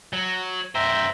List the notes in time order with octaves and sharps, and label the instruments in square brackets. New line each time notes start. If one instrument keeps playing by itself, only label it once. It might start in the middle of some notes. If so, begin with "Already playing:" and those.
[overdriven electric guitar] F#3
[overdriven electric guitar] F#2 C5 [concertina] E5 G5 A#5